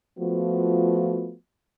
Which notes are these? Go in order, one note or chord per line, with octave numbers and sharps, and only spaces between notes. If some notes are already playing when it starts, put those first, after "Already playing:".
F3 A3 B3 F4 F#4